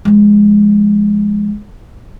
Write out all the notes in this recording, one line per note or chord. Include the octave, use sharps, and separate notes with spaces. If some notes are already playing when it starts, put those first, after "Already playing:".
F3 G#3